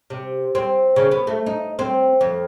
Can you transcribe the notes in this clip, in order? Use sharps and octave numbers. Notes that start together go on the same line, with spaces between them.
C3
C4
C#3
B3
A3
D#4
C4
F2